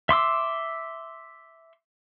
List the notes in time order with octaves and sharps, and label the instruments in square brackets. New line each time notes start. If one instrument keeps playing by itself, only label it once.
[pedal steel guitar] E5 C6 D6 E6